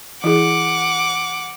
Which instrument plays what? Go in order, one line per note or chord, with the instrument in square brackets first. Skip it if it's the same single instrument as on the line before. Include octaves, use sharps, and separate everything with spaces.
[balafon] E3 E4 G#4 [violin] F#5 D6